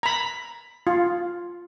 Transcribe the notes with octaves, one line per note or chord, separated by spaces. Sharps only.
A#5 B5
F4